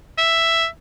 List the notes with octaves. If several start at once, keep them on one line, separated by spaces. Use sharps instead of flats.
E5